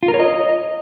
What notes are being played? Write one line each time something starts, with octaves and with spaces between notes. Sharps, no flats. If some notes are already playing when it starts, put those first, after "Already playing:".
F4
A#4
C#5
D#5